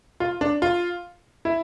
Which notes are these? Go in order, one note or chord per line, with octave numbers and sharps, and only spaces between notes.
F4
D4
F4
E4